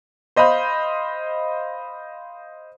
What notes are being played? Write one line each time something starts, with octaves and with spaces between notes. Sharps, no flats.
C5 D#5 F5 B5 G6